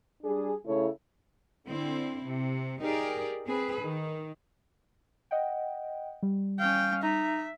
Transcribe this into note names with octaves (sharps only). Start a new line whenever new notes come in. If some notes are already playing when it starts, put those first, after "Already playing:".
G3 D4 G#4
C#3 A3 E4 A4 C#5
D3 C4 E4
C3
D#4 G4 G#4 A#4 D5
C4 G#4 B4
D#3
D#5 F#5 G5
G3
C#4 F5 G5
D#4 E5